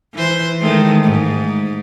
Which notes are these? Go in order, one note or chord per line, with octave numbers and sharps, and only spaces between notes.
E3 C5
D#3 G#3 A3
G#2